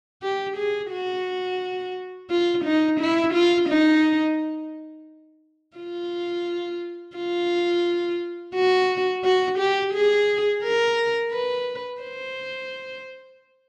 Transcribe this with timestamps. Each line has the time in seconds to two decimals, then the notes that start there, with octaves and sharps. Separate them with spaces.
0.23 G4
0.57 G#4
0.91 F#4
2.30 F4
2.64 D#4
3.00 E4
3.34 F4
3.69 D#4
5.77 F4
7.16 F4
8.55 F#4
9.24 F#4
9.58 G4
9.94 G#4
10.63 A#4
11.31 B4
12.01 C5